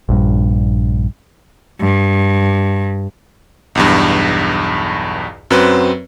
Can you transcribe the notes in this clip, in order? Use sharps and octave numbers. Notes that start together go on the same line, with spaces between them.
A#1 G2
G2
B1 E2 G2
F#2 F#3 C4 B4